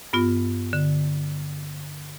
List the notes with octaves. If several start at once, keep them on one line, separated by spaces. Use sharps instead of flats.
G2 B3 F4
D3